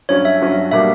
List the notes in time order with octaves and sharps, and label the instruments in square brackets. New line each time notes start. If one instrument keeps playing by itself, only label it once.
[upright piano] G2 F#3 C#4 [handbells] C#5
[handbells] E5
[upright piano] G2 F#3 C#4
[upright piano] B2 G3 A#3 D4 [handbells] E5